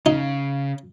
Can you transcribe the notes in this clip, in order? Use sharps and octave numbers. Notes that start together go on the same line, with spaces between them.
C#3 D#4